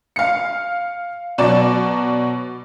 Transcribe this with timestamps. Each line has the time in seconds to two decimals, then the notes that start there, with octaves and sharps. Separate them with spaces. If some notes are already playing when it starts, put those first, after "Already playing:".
0.16 F5 C#7
1.38 B2 F#3 D5 E7